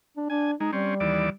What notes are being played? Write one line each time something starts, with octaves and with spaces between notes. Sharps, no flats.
D4
D4 G#5
G#3 D#4
G3 C4 C#4
D#2 E3 D5